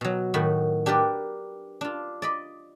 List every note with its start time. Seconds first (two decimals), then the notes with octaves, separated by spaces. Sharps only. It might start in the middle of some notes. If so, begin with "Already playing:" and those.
0.01 B2 F#3
0.34 A2 D#3 F#4 B5
0.86 D4 G4 A#4 B4 D5
1.81 D4 F4
2.22 D5 D#5 B5